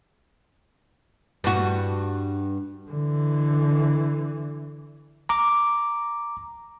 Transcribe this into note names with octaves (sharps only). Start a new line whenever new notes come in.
G2 F#4
D3 E3
A#5 D6